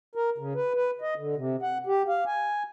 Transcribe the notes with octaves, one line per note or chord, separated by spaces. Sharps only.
A#4
C#3
B4
B4
D#5
D3
C3
F#5
G4
F5
G#5